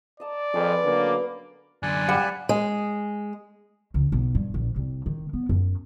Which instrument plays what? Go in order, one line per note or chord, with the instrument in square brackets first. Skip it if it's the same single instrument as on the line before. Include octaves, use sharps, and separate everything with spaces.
[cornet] D5 [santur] D#5 A5 A#5
[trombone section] F2 [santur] G#4 B4
[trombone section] D3 F#3 A#3 [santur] B3 C#4
[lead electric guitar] F#2 D3 [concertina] D5 G#5 F#6
[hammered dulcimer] G3 [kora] F#5
[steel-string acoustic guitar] G#3
[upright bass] C#2
B1
G2
A#1
C2
D#3
B3
F#2